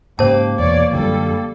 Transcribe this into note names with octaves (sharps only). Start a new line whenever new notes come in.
G#2 C#3 A#3 G4 C5 A5
E2 B2 C#5 D5
F#2 D3 F3 G3 A4